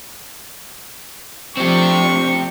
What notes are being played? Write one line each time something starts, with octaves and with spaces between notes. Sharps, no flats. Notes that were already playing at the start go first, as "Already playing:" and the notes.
F3 A3 C4 D4 G4 C#6